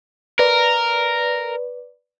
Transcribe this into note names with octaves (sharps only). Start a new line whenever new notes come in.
A#4 B4 D5